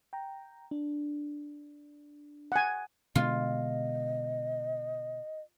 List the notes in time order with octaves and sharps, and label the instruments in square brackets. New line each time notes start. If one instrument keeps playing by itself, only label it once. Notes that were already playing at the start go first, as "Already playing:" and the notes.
[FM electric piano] G5 A#5
D4
[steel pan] F#5 G#5
[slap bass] B2 D3 G#3 [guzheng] F4 [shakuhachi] D#5